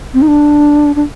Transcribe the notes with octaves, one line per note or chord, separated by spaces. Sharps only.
C4
D#4
D4
D4